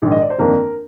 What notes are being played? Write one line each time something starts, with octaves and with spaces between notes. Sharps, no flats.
A#1 G#2 D#3
D#5
D5
C5
G1 F2 D#3 A#3 D4 A#4